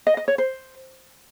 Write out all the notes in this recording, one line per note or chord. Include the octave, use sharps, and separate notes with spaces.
D#5
D#5
C#5
C5